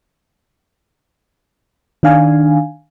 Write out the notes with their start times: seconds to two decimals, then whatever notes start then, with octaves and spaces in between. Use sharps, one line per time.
2.03 D#3 D4 F5 G#5